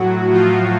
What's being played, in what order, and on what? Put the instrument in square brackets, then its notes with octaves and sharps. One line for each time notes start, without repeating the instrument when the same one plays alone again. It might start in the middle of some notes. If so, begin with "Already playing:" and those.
Already playing: [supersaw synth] A2 F#3 F#4
F3 F4